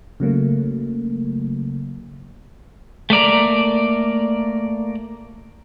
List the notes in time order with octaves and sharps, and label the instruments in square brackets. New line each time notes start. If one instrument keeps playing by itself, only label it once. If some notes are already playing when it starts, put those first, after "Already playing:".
[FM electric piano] C#3 F#3 A3 A#3
[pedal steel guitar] A3 A#3 D5 A#5